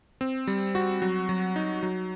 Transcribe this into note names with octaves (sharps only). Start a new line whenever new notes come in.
C4
G3
F#4
F#3
F#3
D#4
F#3